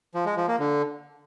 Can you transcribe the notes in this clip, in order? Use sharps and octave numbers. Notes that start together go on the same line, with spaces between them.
F3
G#3
F3
A#3
D3